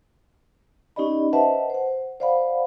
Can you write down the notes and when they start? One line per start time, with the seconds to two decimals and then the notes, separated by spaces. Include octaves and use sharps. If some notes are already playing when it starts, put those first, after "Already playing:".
0.96 C#4 D#4 G4 D5 D#5 B5
1.33 B4 C5 D#5 E5 F#5 A5
1.70 C5 F#5
2.20 C5 D5 F5 F#5 B5